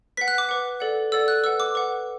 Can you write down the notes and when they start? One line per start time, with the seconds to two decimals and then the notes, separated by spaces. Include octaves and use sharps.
0.17 B4 F#5 B6
0.28 F#6
0.38 D6
0.49 B4 F#5
0.80 A4 D5 F#5
1.12 A4 D5 F#5 E6
1.28 F#6
1.44 B4 F#5 E6
1.60 D6
1.75 B4 F#5